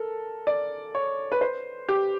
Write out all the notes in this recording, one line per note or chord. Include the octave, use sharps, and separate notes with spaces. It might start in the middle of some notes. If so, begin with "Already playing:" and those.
Already playing: A4 A#4
D5
C#5
B4
C5
G4